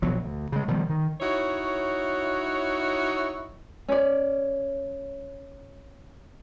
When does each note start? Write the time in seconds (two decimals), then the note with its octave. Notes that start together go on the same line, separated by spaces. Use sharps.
0.02 A#1 B2 F3 F#3
0.25 D2
0.52 C#3 G#3
0.68 B2 D#3 F3 G3
0.90 D#3
1.21 D#4 E4 F#4 C#5
3.89 C#4 D5